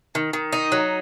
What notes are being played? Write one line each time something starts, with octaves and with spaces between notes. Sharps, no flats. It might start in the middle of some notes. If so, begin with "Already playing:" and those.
D#3
D#3
D#4
F#3